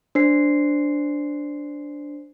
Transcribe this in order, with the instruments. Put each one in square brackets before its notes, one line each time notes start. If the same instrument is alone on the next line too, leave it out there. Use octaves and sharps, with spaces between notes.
[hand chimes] D4 C5 C7